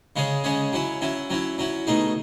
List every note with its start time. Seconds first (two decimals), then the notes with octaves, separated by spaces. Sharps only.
0.16 C#3 G#3 C#4 G#4
0.44 C#3 G#3 C#4 G#4
0.73 F#3 C#4 E4
1.01 F#3 C#4 E4
1.30 F#3 C#4 E4
1.58 F#3 C#4 E4
1.87 B2 A3 D#4 G#4